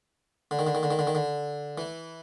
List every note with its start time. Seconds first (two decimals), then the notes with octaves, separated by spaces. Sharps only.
0.51 D3
0.59 D#3
0.67 D3
0.75 D#3
0.83 D3
0.91 D#3
0.99 D3
1.07 D#3
1.15 D3
1.78 E3